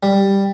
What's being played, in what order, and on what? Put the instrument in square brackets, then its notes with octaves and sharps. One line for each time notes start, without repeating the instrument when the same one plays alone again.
[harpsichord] G3